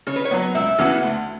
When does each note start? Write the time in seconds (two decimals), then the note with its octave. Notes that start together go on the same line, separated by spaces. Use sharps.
0.07 C#3 C#5
0.16 B4
0.25 C#5
0.31 F#3 B3
0.55 C#2 E5
0.78 C#3 E3 B3 F#4
1.03 D2